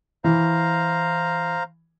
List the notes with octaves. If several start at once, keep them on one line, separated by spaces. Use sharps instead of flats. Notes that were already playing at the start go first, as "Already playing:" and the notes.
E3 C5 F5 A#5